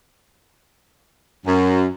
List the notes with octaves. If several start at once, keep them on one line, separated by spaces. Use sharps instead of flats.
F#2